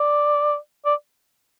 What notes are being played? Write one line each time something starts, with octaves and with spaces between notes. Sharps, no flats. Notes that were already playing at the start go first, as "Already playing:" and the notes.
Already playing: D5
D5